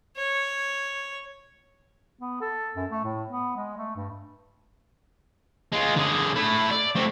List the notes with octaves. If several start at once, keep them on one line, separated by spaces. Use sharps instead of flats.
C#5
B3
A4
F#2
A3
A2
B3
G#3
A3
G2
G#3 F4
D3 G#4
A3 E4
D5
A3 C4